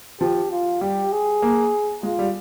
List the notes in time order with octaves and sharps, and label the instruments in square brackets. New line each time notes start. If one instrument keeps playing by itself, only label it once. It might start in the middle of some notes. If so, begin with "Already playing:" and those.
[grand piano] F3 [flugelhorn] G4
[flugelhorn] F4
[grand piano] G3 [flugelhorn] G4
[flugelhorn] G#4
[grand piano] A#3
[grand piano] G#3 [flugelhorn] F4
[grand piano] G3